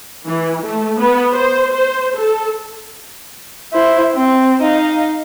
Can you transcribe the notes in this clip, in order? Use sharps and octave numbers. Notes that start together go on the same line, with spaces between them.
E3
A3
B3
C5
C5
A4
E4 C5
C4
D#4 F5